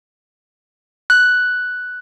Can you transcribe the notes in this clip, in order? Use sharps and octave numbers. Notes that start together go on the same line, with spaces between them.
F#6